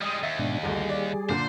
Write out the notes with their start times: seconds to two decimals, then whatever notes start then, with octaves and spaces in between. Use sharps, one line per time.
0.01 G3 G#3 D#5 D#6
0.23 D#2 E5
0.39 G#2 B2 D4
0.63 A1 D2 G3 G#4
0.89 D5
1.29 A#2 D3 C5